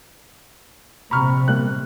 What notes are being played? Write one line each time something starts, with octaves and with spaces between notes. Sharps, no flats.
A#1 C3 A#5 B5 C#6 F6
B2 G3 A#3 F#6